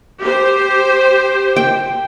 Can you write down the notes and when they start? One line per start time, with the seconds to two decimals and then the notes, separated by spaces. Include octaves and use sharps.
0.20 G4 C5
1.56 G5